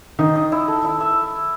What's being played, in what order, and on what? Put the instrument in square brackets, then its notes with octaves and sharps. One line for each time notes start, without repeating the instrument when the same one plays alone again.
[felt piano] D#3 D#4 [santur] D#5
[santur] D#5
E4
A4
E4
E5